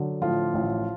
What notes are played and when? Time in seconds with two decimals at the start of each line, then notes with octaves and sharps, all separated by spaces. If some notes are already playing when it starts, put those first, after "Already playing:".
Already playing: D3 F#3
0.22 A2 F3 F4
0.54 A1